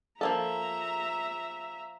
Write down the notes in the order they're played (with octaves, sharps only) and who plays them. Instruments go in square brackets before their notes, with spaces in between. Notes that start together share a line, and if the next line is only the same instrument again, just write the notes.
[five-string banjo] F3 A#3 A4 [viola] E5 A#5